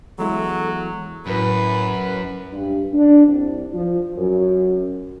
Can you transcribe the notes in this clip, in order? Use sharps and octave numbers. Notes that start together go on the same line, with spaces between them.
E2 F#3 G#3 E4 A4
F#2 A2 B4
G2
D4
C2
F3
F#2